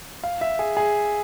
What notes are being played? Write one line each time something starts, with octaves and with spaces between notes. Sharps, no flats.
F5
E5
G#4
G#4